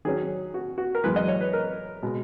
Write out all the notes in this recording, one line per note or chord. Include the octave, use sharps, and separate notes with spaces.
D#3 F#3 C#4 G#4
F#4
F#4
A#4
F#2 E3 G#3 B4
D#5
C#5
B4
A#4
B2 G#3